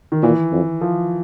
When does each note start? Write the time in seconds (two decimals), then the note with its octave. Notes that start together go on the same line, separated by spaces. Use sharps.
0.12 D#3
0.22 A#2 E3
0.52 F2
0.81 F3